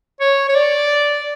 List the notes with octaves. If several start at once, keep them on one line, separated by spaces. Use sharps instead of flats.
C#5
C#5
D5